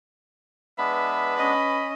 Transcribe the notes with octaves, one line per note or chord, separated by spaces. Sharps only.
G#3 B3 D4 B4 E5
C#4 D#5 B5